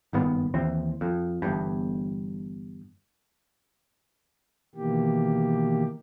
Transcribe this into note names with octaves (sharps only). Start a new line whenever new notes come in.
F#1 G2 D#3 B3
D#2 E3 C4
F2
G1 E2 G2
B2 D#3 E3 A#3 G4